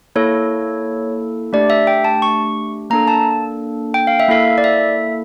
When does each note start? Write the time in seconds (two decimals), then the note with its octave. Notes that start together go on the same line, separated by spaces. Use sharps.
0.15 A#3 E4 A4 C#5
1.53 A3 D4 G4 D5
1.70 E5
1.87 G5
2.05 A5
2.22 C#6
2.90 A#3 D4 A4 A#5
3.08 A5
3.94 G5
4.07 F5
4.20 E5
4.28 A#3 E4 A4 F5
4.58 D5
4.64 E5